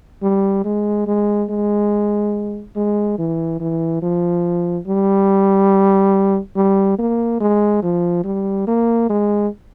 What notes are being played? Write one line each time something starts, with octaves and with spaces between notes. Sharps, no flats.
G3
G#3
G#3
G#3
G#3
E3
E3
F3
G3
G3
A#3
G#3
F3
G3
A#3
G#3